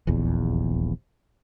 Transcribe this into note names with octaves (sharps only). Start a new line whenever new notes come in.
D#1 A#1 E2